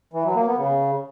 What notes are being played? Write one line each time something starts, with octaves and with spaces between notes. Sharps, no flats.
E3
F#3
A#3
B3
C#3